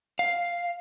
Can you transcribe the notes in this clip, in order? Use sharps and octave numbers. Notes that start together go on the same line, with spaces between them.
F5